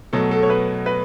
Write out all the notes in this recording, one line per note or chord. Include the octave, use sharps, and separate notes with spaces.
B2 F#3 A3 A4
A4
C#5
B4
B4